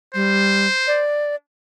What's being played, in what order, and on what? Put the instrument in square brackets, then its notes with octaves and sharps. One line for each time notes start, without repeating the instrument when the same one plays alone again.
[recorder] G3 [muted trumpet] C5
[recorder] D5